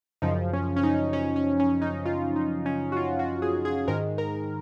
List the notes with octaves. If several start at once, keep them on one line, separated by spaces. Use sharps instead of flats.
F#2 C#3 F3 D#4
C#4
C#4
D#4
C#4
C#4
C#4
D#4
F4
D#4
C#4
F#4
F4
F#4
G#4
G#4
G#2 D#3 G#3 A#4
A#4